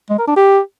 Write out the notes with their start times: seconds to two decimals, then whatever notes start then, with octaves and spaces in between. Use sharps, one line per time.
0.10 G#3
0.19 A#4
0.27 D4
0.36 G4